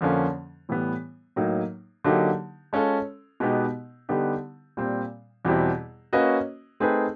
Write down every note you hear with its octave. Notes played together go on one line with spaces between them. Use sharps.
F2 D3 F3 A#3 C#4
A2 E3 G3 B3
A2 F#3 A#3 D#4
D3 F#3 A#3 D#4 G4
G#3 C#4 F4 A4
B2 G#3 B3 D#4 G4
D3 G3 B3 D#4 G4
A#2 G3 C4
E2 B2 G3 C4 E4
A#3 C#4 F#4 B4 D#5
A3 C4 D#4 G#4 B4